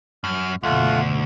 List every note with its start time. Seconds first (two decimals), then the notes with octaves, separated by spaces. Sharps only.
0.24 F#2 F6
0.63 F#1 D2 B2 A3 F4 F#5